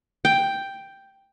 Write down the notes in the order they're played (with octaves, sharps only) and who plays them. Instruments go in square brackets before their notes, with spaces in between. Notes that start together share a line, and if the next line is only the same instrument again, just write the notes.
[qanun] G5